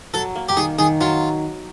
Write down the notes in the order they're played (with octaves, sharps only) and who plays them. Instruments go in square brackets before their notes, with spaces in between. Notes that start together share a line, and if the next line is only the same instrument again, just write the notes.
[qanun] F#3 [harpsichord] A4
[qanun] A#3
[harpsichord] G4
[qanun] D#3 [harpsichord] G#4
[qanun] D#3 [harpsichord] G#4
[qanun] F#3 [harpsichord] F4